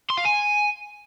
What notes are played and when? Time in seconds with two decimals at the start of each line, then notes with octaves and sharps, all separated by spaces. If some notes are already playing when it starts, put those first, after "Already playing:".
0.10 C6
0.18 F5
0.25 G#5